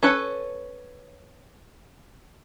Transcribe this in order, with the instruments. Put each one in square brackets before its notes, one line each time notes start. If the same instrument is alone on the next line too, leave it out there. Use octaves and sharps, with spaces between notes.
[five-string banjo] C#4 A4 B4 C#5